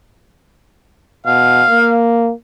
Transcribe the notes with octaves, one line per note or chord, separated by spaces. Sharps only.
B2 F5
A#3